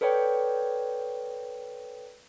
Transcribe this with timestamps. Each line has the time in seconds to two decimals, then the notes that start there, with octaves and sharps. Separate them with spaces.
0.01 A4 B4 C#5 D5 G5